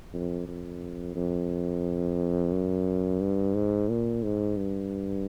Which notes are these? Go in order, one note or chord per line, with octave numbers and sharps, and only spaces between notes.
F2
F2
F2
F#2
G2
G#2
A#2
G#2
G2